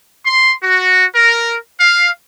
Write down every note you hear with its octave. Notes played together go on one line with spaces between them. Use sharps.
C6
F#4
A#4
F5